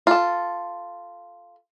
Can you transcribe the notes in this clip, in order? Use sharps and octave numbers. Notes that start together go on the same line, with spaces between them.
F4 A4